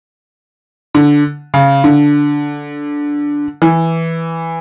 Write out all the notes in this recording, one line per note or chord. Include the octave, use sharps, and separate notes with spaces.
D3
C#3
D3
E3